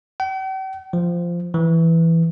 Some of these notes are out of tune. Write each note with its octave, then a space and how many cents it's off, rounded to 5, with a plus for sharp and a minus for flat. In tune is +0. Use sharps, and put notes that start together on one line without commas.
G5 -45
F3 -10
E3 +5